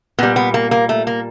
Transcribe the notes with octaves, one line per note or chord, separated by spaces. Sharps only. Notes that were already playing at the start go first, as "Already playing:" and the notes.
A#2 G3 B3
B3
A#3
A#3
A3
A#3